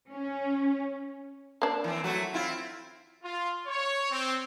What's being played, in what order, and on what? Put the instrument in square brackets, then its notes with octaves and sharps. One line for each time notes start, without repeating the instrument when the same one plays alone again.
[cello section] C#4
[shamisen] A#3 D4
[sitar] E3 C4
F#3 A3 F#4
C4 E4 F4
[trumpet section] F4
C#5
C4